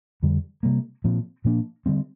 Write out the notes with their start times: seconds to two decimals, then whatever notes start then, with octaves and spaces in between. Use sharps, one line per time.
0.23 F2 D3 G3
0.63 C3 G3 A#3
1.04 A#2 F3 C4
1.45 A#2 F3 A#3 D4
1.86 D3 G3 C4